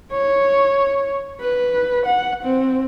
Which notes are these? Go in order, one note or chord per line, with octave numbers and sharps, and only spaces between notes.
C#5
B4
F#5
C4